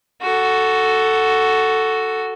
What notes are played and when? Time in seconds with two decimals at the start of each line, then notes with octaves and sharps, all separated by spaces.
0.22 F#4 A4